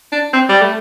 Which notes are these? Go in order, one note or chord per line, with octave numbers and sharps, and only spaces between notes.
D4
C4
G3
A3